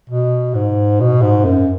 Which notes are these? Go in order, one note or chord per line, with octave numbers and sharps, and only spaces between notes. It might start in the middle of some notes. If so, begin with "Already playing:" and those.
B2
G#2
B2
G#2
F#2